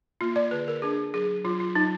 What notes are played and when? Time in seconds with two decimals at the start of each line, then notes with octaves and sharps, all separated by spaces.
0.21 A#3 F4
0.36 D5
0.51 D3 B4
0.68 A#4
0.82 D4 G#4
1.14 F#3 G#4
1.45 F#3 F4
1.60 F4
1.75 F#3 D#4